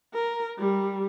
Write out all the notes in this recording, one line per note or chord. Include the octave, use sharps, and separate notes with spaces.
A#4
G3